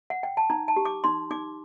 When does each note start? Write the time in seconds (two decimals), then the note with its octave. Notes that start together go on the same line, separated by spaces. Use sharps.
0.10 F#5
0.23 G5
0.37 A5
0.50 D#4 A#5
0.68 A5
0.76 G4
0.85 D6
1.04 D#4 C6
1.31 D#4 D6